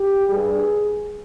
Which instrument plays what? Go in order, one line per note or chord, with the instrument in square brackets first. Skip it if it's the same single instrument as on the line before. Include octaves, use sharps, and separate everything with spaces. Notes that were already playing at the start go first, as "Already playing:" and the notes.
Already playing: [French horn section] G4
G2 G3 G#4